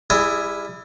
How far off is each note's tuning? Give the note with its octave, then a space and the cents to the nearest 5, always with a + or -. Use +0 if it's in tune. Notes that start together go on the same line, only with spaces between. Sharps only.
G3 +30 E4 +0 G#4 +0